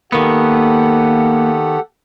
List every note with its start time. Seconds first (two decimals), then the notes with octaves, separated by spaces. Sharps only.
0.12 D#3 A#3 B3 G4 A4 F#5